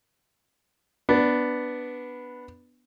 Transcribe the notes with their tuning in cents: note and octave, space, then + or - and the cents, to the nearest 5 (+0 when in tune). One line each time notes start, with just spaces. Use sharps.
B3 +0 D4 +0